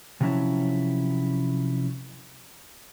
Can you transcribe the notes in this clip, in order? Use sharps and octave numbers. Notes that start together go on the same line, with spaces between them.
C3 F3 F#3 C#4 E4 A5